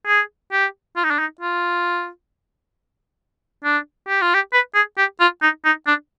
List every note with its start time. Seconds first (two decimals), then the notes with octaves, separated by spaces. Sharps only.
0.07 G#4
0.52 G4
0.96 F4
1.04 D#4
1.11 D4
1.19 D#4
1.41 F4
3.64 D4
4.08 G4
4.21 F4
4.34 G4
4.53 B4
4.75 G#4
4.98 G4
5.20 F4
5.42 D#4
5.65 D#4
5.87 D4